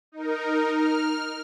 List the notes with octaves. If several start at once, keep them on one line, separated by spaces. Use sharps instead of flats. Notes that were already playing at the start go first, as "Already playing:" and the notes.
D#4 A#4
F6